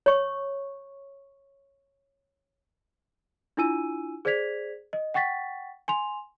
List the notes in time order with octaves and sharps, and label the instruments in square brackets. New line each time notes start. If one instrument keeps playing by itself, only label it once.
[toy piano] C#5 C#6
[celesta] D4 E4 F4 G#5 E6 D#7
G#4 C5 D5 G#6 B6 F7
D#5
F#5 G5 C#6 A6 B6
G#5 C6 F7